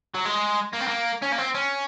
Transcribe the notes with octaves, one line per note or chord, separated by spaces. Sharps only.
F#3
G#3
A#3
C4
A#3
C#4
A#3
C4
C#4